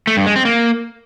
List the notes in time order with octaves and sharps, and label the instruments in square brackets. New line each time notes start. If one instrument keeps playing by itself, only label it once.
[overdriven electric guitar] A3
G2
G#3
C4
A#3